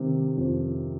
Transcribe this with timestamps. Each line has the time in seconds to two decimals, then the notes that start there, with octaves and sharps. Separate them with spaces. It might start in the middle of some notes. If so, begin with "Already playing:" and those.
Already playing: C3 D#3
0.37 F2